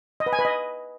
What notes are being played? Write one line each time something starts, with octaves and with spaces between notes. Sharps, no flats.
D#5
B4
G#5
B4
D#5